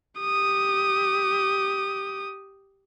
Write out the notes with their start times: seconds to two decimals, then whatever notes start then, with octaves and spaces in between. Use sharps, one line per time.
0.20 G4 D#6